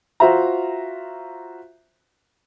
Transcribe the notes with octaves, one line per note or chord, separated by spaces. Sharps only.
F4 F#4 C5 E5 A#5